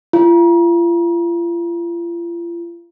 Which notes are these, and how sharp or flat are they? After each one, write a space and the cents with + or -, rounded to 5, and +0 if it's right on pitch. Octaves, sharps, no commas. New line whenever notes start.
F4 -40